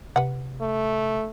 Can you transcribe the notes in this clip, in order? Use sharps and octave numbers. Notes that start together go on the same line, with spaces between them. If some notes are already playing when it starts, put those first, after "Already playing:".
C3 B4 F#5
A3